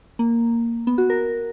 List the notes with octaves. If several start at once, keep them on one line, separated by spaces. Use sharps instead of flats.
A#3
B3
F#4
A#4